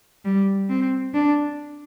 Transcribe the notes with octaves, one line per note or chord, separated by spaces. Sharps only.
G3
C4
D4